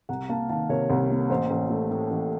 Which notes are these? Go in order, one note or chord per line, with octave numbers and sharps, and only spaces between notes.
C2 F#5 A#5
A#3 F5 A5
D#3 F5 A5
C3 A#4 C#5
C2
A#3
A1 C5
A1
A3
A2
A1